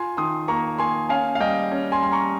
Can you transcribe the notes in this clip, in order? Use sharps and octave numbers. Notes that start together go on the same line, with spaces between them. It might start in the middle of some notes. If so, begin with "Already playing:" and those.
Already playing: F4 G#5 C6
D#3 C6 D#6
A#3 A#5 C#6
A#3 G#5 C6
C#4 F5 G#5
F5
G3 D#5 G5
C#4
G#5 C6
G3 C6
A#5 C#6